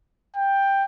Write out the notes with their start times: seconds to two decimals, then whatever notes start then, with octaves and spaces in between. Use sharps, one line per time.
0.36 G5